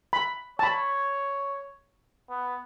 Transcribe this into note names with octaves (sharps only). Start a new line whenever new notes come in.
B5
C#5 A5 B5
B3